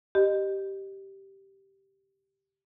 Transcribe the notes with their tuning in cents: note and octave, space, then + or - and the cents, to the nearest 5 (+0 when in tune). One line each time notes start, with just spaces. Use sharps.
G4 -10 D#5 -20